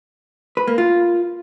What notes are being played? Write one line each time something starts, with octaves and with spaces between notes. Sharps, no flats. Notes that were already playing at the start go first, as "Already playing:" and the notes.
B4
A#3
F4